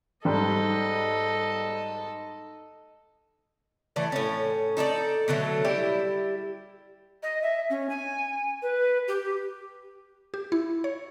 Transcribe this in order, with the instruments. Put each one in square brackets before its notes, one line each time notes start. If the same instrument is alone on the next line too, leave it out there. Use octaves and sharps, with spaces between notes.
[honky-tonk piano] G#2 G3 [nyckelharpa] A4 D#5
[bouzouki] E3 A3 D5
A2 C#4
D#4 A4 C5 D5
B2 D3 F#3 A3
G3 E4 G4
[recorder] D#5
E5
C#4
G#5
B4
G4
[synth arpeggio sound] G4
E4
C#5